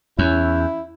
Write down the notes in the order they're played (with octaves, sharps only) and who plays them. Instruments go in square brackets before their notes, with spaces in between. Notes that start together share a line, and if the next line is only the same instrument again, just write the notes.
[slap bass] E2 [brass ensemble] C#4 [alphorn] E4